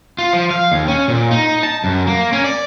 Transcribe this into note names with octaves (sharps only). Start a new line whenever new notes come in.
F4
F3
F5
D#2
C#4
A#2
D#4
A5
F#2
A#3
C#4
D5